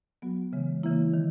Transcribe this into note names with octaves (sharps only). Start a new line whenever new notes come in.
F#3 B3 F#4
C#3 E3 G#3
C#3 E3 A#3 E4
D#3